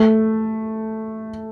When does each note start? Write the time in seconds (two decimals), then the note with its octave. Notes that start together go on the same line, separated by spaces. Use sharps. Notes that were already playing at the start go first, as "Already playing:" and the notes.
Already playing: A3